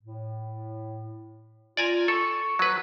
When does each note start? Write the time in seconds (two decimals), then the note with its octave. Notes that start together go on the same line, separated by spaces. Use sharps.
0.03 A2
1.77 F4 D5 G#5 A#5
2.08 A4 C#6
2.59 F#3 B4